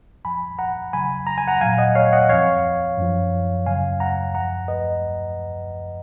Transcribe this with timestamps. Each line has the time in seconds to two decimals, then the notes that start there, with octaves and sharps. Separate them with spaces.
0.24 F2 F3 G#5 B5
0.59 F#5 A#5
0.93 F2 C#3 F#3 G#5 B5
1.27 A#5
1.38 G#5
1.48 F#5 A#5
1.61 A#2 F#3 F5 G#5
1.78 D#5 F#5
1.95 C#5 F5
2.13 D#5 F#5
2.29 F2 F3 C#5 F5
2.97 F#2 F3
3.66 F#2 C#3 F#3 F5 G#5
4.00 F#5 A#5
4.34 F#2 F3 F#5 A#5
4.68 B4 D#5